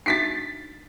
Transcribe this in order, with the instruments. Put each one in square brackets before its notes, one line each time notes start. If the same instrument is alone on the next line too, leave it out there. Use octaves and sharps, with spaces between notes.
[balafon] D4 D#4 F#4 [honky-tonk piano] A6 B6 C7